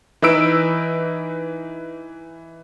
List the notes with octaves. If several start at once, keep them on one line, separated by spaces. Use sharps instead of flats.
E3 D#4 B4 E6 D7